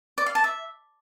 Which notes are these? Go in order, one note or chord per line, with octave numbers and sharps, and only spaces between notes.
D5
F5
A5
E5